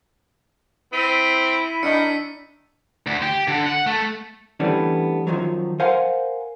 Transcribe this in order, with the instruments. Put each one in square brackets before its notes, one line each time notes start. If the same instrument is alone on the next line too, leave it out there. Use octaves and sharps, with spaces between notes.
[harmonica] C4 [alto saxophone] E4 [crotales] E6 B6 D#7
[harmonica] D#3 [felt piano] D4 D#5 [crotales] B6 C#7
[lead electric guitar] D2
G4
D3
F#5
A3
[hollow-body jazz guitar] E3 G3 A3 B3 C#4 D4
F#2 D#3 F3 F#3
A#4 C5 F5 F#5 G#5